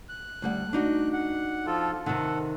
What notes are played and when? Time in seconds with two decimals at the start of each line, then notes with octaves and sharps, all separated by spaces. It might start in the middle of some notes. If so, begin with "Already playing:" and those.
0.09 F#6
0.42 D2 G3 F#5
0.73 D4 D#4 F#4
1.13 F#5
1.67 F3 F4 A4
2.06 C3 D#3 A4 F#5